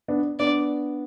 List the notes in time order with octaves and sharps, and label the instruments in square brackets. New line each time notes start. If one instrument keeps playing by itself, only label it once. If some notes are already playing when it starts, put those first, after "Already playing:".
[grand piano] B3 D4
[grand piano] B3 D4 [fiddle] D5